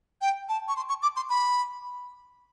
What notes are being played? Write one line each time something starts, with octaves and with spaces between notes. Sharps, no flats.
G5
A5
C#6
C6
C#6
D6
C6
B5